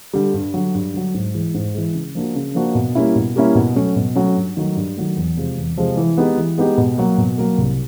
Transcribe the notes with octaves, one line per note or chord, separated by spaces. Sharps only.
D3 G3
G2
D3 F#3
G2
D3 F#3
G#2
E3 G#3
G#2
E3 G#3
C#3
F3 A#3 D4 F#4
C#3
F3 A#3 D4 F#4
B2
G3 A#3 C#4 E4
B2
G3 A#3 C#4 E4
B2
F#3 A3 C#4
B2
F#3 A3 C#4
G2
D#3 F#3 A3
G2
D#3 F#3 A3
E2
C3 F3 G#3
E2
C3 F3 G#3
E3
G#3 B3 D#4 G4
E3
G#3 B3 D#4 G4
B2
F#3 A#3
B2
F#3 A#3
C2